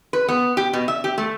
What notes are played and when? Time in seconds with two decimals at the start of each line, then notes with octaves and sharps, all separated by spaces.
0.13 B4
0.28 B3
0.57 G4
0.73 B2
0.88 E5
1.04 G4
1.18 A3